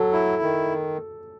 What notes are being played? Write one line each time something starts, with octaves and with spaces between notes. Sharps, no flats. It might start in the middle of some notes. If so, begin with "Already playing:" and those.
Already playing: F#3 A4
E4
D#3